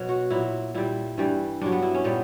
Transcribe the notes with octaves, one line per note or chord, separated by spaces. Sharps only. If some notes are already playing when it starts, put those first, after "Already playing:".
Already playing: B2 F#3
F#4
A#2 F#3 E4
A#2 G3 E4
G2 E3 G3
G2 F#3 D4
B3
E4
C#4
A#2 G3 B3